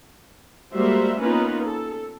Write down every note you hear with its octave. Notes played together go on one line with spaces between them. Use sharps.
G3 G#3 A#3 F#4 C5 E5
A#3 B3 C#4 D#4 F4 B4
A4